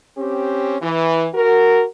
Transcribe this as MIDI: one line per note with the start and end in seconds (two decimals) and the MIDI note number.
0.18 0.76 60
0.18 0.76 61
0.18 0.76 67
0.82 1.27 52
1.34 1.84 66
1.34 1.84 70